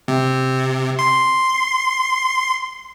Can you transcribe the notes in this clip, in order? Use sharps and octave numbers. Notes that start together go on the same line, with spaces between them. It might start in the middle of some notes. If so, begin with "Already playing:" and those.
C3
C6